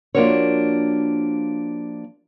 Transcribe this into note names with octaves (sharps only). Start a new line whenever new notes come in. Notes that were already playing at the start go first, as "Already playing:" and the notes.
F3 A#3 D4 F#4 A#4 C#5